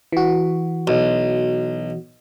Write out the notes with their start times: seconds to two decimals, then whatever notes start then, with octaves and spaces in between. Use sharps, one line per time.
0.12 E3 F#4
0.87 B1